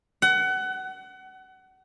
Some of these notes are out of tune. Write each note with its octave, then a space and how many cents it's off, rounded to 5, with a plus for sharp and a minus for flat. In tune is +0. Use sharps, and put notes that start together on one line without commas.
F#5 +25